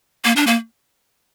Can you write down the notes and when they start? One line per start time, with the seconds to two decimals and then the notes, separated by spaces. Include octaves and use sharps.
0.25 A#3
0.36 D4
0.47 A#3